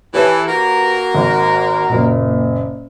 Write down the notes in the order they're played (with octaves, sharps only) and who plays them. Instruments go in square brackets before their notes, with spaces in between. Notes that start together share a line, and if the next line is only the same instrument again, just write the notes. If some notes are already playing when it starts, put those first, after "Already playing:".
[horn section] E3 A4 [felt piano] G4 B4 C#5
[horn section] A#3 F#4 A#4
[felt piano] G#1
F#1 A#2